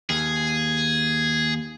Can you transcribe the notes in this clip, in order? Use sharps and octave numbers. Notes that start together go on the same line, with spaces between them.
D#2 G#4